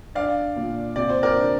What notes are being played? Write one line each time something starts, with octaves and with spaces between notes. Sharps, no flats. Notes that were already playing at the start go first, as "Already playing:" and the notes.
D4 D5 F5
A#2
C3 D5
C5
A#4 D5
D4